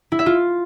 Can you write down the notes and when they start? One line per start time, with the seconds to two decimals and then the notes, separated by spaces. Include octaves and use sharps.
0.12 E4
0.19 E5
0.26 F4